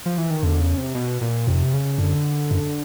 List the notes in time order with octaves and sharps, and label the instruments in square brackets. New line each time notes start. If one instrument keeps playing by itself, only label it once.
[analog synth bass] F3
E3
D#3
[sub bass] E2 [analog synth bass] D3
[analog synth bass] C#3
C3
B2
A#2
[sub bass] F2 [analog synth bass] C3
[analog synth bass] C#3
[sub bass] F#2 [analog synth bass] D3
[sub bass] F#2